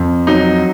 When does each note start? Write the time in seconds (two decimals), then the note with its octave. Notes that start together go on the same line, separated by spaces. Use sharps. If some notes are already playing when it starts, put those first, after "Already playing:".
Already playing: F2
0.27 F#3 D#4